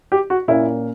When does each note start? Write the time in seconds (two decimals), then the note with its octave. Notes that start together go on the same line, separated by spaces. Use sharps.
0.12 G4
0.30 F#4
0.48 A#2 A#3 C#4 E4